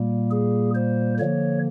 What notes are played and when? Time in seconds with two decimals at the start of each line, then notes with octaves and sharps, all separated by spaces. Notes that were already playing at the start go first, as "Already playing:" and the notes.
Already playing: A#2 G3 A#3
0.31 G#4
0.75 C5
1.19 D3 F3 A#3 C#5